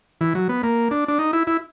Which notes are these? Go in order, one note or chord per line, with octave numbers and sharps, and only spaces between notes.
E3
F#3
B3
A#3
D4
D4
D#4
E4
E4